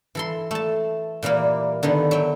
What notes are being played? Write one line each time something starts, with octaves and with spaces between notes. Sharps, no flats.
E3 A4 C6
A3 A5
A#2 E3 G3 A#3
D3 D#3 B3
F#3 E5 G5